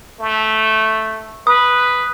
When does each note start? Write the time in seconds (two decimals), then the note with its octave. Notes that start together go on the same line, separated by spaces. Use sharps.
0.20 A3
1.47 B4 D#6